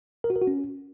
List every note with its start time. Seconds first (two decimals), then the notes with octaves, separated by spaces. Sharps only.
0.24 A#4
0.30 F#4
0.36 A#4
0.42 F#4
0.47 C#4